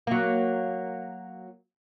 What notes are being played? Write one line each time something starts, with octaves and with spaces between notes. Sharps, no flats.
F#3 A#3